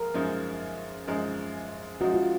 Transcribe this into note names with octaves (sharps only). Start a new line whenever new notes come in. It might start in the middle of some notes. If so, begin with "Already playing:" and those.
Already playing: F3 G#3 A#4
F#2 F3 G#3 D#4
F#2 F3 G#3 D#4
F#2 F3 G#3 D#4 F#4
F4